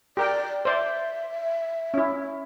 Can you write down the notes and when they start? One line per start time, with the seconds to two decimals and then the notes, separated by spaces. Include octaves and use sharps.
0.17 G4 A#4 D5 G5
0.65 C5 D5 E5
1.94 C#4 E4